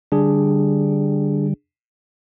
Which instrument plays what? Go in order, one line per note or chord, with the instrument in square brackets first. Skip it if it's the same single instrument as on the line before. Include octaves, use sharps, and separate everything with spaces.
[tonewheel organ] D3 G3 [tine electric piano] D4 G#4